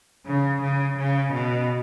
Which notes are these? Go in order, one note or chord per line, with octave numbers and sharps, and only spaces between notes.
C#3
C#3
C#3
B2